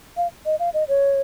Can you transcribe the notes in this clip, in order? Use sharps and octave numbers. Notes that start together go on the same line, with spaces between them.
F5
D#5
F5
D#5
C#5